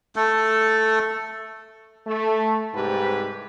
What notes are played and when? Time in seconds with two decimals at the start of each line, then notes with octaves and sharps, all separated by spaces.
0.16 A3 A4
2.06 A3
2.74 C2 G#2 G4 B4